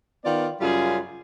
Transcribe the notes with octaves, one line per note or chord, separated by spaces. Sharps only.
D#3 B3 F4 D5
F#2 C#3 G3 F4 G#4